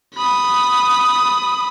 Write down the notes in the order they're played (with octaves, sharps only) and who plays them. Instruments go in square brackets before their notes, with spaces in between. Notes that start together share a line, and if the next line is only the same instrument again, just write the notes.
[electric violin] B5 D#6